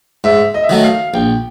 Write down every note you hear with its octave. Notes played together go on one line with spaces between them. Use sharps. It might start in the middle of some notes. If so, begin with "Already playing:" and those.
G#2 E5
D#5
E5
D#3 F#3 A3 D#5
F5
A#1 G5